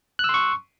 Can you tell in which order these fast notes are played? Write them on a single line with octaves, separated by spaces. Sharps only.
F#6 E6 C6 C#6